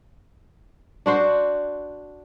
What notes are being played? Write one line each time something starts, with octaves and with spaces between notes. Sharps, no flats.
D4 F#4 C5